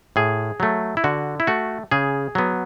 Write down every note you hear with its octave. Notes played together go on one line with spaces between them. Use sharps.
A2 G#4
F#3 A3
E4
D3 F#4
E4
A3 F#4
C#3 G#4
F#3 B3